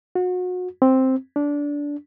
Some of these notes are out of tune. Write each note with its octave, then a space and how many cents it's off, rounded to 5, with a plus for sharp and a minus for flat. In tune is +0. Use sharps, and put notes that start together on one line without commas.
F#4 -30
C4 +0
D4 -15